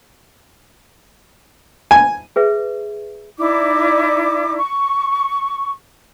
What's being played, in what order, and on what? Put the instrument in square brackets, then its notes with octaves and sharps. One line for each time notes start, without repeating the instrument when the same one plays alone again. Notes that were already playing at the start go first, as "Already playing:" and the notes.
[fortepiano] G#5
[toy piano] G#4 B4 E5
[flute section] D#4 E4 D5 D6
C#6